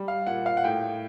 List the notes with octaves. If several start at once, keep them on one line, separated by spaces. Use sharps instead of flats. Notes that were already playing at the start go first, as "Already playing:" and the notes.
Already playing: G3
F5
A#2 F#5
F5
F#5
A2 G5